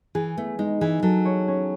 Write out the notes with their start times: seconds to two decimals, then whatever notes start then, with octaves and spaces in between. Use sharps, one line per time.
0.15 E3 G#4
0.36 A3 B3
0.58 G#3 D#4
0.81 E3 G#4
1.03 F#3 A4
1.25 C#5
1.48 C#4